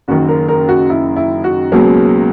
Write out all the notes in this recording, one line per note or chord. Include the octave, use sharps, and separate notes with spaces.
F#1 F#2 D#3 F#4
A#4
A#4
F#4
E4
E4
F#4
C#2 B2 F#3 A#3 G#4